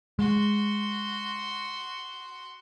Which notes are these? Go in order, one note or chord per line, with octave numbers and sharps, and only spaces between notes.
G#3 F#4 C6